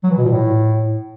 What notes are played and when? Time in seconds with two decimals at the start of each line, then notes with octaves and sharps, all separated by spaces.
0.04 F#3
0.11 E3
0.18 B2
0.25 A#2
0.32 A2